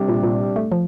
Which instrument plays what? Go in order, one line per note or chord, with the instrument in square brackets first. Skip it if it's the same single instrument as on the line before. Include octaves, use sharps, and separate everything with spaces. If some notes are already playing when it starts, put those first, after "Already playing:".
Already playing: [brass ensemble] C3 G3 D4
[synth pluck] A#2
A#2
A3
F3